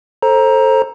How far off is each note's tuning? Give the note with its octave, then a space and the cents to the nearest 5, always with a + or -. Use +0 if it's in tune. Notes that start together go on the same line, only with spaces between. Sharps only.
A4 +0 C5 +20 A#5 +10